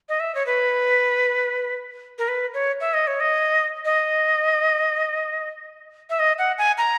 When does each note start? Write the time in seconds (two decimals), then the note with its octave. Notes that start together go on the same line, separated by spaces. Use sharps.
0.09 D#5
0.20 E5
0.35 C#5
0.46 B4
2.19 A#4
2.28 B4
2.54 C#5
2.80 E5
2.94 D#5
3.07 C#5
3.20 D#5
3.85 D#5
6.10 E5
6.19 D#5
6.39 F#5
6.58 G#5
6.78 A#5